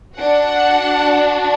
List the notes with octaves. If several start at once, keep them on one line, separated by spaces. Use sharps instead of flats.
D4 F#4 F#5